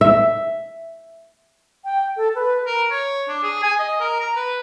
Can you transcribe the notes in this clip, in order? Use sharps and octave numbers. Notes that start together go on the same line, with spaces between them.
E5
G5
A4
B4
A#4
C#5
D4
G#4
G#5
D#5
A#4
A#5
B4